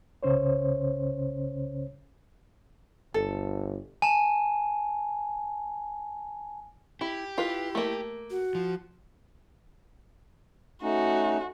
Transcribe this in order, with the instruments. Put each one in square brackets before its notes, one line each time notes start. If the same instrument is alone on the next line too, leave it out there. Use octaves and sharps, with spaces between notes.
[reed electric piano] C2 C#3 C#4 C5 C#5
[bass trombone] G1 [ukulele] A4
[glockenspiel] G#5 A5
[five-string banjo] E4 [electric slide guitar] G4
[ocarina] E4 [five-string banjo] F4 B4
[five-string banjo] A3 A#3
[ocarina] F#4
[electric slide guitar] F3
[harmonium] A3 C#4 D#4 [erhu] F#4